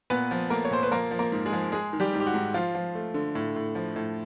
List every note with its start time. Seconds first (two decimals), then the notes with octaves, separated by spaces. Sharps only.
0.10 A#2 B3 B4
0.31 F3
0.50 A3 A#3 A#4
0.65 C#5
0.71 A#2 C5
0.83 B4
0.91 F3 A#3 A#4
1.11 F3
1.19 A#3 A#4
1.32 G#2
1.46 G#3 G#4
1.52 F3
1.72 G#3 G#4
1.93 D#3
2.00 G3 G4
2.14 G#2
2.20 G4
2.27 F#4
2.34 G#2
2.54 F3 F4
2.75 F3
2.95 A3
3.14 D3
3.35 A2
3.56 A2
3.75 F3
3.96 A2